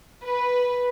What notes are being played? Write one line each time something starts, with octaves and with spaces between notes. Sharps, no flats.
B4